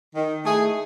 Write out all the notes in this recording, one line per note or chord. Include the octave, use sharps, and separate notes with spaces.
D#3
A3 E4 G#4